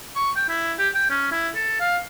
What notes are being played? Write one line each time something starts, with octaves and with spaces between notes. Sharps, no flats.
C#6
G5
E4
G4
G5
C#4
E4
A4
F5